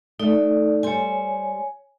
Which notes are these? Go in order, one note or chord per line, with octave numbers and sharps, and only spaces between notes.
A3 D#4 D5
G3 C5 C#5 G#5